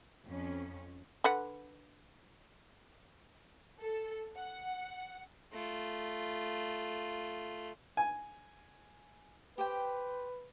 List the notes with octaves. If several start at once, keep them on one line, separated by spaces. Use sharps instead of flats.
F2 C#4
D3 B4 F#5
A4
F#5
A3 F4
G#5
G4 B4 C5 G5